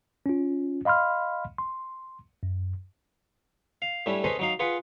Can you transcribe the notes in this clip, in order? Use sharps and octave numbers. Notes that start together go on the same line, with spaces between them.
C#4 F4
D#5 F5 B5 C6 F6
C6
F#2
F5
A2 G3 C#4 D4 E4
C#4 G#4 A4 B4 C5 D#5
F#3 D#4 F5
F4 G#4 B4 F#5